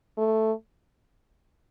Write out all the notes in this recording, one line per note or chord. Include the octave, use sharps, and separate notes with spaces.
A3